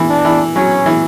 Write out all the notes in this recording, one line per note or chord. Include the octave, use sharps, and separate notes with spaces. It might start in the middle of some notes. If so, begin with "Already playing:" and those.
Already playing: E3
D4
E3
F#3 C#4
E3